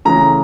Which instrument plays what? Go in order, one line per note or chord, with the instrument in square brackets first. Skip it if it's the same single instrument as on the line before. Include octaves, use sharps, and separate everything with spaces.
[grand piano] C#3 E3 A3 A#5